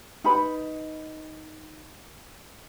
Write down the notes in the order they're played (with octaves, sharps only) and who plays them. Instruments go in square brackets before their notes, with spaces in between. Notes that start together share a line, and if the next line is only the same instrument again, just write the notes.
[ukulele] D#4 B4 B5